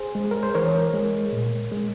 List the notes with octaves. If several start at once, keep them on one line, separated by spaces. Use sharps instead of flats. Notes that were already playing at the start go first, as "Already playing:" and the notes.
Already playing: G#4 C5
G#3
A#4
C5
E3 A#4 C#5
G#3
A#2
G#3